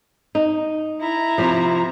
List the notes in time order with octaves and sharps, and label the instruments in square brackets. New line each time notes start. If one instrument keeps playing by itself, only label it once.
[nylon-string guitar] D#4
[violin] E4 A#5
[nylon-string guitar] C3 F3